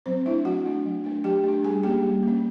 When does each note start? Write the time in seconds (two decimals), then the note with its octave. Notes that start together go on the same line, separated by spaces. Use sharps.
0.06 F#3 C4 C5
0.25 A3 D4 E4 E5
0.45 F#3 F#4 F#5
0.65 A3 D4
0.86 F#3
1.04 A3 D4
1.24 F#3 G4 G5
1.44 A3 D4
1.63 G3 G#4 G#5
1.83 A#3 C#4 G4 G5
2.03 G3
2.23 A#3 C#4